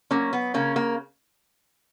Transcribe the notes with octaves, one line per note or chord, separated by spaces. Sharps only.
F#3 A#3 C#4
B3
C#3 A#3 C#4
A#3